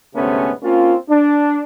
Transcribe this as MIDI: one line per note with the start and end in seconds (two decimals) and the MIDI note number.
0.14 0.50 38
0.14 0.50 44
0.14 0.50 48
0.14 0.50 57
0.14 0.50 59
0.14 0.50 61
0.62 0.93 58
0.62 0.93 60
0.62 0.93 61
0.62 0.93 65
1.09 1.63 62